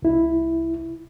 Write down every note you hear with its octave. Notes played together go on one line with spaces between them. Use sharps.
C2 E4